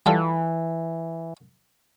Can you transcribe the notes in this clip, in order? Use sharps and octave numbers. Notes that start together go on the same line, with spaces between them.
E3 G3 F4 A4